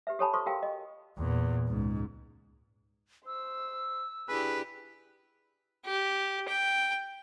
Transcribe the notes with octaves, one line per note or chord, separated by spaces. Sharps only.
G4 B4 E5
G4 A4 C#5 G#5 A5 B5
F4 A4 C5 C6 C#6
F#4 G4 A#4 F5 G5
D#5
E2 A#2
C#2 G#2
C5 E6
D4 E4 G4 G#4 B4
G4
G5